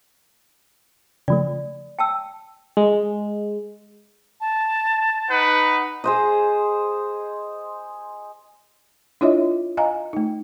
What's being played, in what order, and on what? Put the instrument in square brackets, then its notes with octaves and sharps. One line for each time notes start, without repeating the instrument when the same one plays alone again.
[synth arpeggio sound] C#3 F3 A3 [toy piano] D5
[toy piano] G5 A5 E6
[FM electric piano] G#3
[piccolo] A5
[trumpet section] D#4 B4 F#5
[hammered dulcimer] G#4 C5 D#5
[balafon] D4 E4 F4 C#5 D#5 E5
D#5 F5 G#5 A#5
A3 D#4